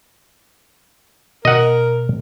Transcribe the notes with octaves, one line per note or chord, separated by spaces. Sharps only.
B2 A#4 D#5 F#5